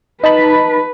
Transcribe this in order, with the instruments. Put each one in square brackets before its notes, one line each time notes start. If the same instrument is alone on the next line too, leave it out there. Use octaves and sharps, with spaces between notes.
[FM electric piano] D#4 A5 B5 [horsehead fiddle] B4